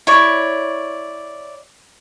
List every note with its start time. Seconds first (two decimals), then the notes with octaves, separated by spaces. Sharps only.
0.07 E4 C#5 D5